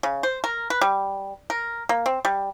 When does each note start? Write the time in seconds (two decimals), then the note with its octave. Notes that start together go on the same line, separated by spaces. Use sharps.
0.03 C#3
0.23 C5
0.44 A#4
0.70 B4
0.81 G3
1.50 A#4
1.89 A#3
2.06 C4
2.25 G3